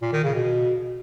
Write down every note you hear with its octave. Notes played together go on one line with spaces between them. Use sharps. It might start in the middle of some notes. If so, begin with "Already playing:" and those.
A#2
D#3
C#3
B2